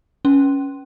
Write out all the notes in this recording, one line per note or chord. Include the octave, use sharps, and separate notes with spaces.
C#4